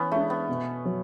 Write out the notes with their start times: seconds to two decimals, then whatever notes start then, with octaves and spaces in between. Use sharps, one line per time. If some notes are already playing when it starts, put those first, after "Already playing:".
Already playing: E3 B3 C#4
0.11 G#3 A3 D4
0.30 B3
0.49 B2
0.85 F#3